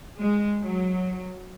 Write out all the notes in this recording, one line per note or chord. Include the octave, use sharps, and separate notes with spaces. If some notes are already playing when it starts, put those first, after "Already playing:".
G#3
F#3